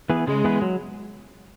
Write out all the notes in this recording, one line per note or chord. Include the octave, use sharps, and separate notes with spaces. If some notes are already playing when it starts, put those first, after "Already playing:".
E3 B3 G#4 B4
C#3 G#3
E3 B3 G#4 B4
F#3